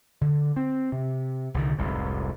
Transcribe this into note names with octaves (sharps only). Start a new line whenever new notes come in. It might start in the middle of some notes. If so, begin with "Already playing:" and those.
D3
C4
C3
C2 D3 D#3
F1 C2 G#2